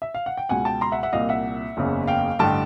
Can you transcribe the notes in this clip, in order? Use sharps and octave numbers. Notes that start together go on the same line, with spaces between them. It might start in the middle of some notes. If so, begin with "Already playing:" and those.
E5
F5
F#5
G5
C#2 B2 F#5 G#5
G5 A5
A#5 C6
E5 F#5
E5 F#5
C2 A#2 D#5 F5
E5 F#5
F#1 E2 C#3
F5 G5
A1 G2 D3 G5 A5